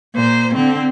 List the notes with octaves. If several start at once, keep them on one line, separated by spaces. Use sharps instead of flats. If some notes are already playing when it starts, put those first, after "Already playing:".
A#2 C5
D3 C4